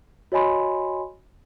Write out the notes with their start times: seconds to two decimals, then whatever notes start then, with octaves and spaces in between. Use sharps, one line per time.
0.32 F#4 C#5 D#5 G#5 B5 C6